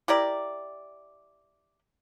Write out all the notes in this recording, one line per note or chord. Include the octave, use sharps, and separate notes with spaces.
E4 G4 A#4 D5